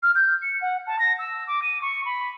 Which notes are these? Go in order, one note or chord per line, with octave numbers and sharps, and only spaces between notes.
F6
G6
C#7
F#5
A5
A#6
E6
D6
D#7
C#6
B5